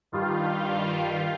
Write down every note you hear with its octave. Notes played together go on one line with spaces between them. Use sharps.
G2 D#3 G3 F4